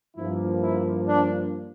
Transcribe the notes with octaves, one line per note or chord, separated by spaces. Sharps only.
G2 F3 A#3 E4
E4
D4